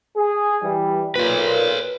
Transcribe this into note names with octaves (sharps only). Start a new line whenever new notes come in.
G#4
E3 G3
A#2 B4 C#5